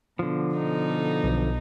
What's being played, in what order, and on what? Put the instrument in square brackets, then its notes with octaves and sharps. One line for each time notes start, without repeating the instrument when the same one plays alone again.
[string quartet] B2 [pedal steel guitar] D3 F3
[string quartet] B2 D#4 A4
[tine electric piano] B1